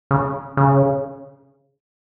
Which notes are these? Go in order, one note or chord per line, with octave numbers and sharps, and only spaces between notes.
C#3
C#3